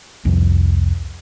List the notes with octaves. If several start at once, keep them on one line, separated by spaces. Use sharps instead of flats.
C2 F2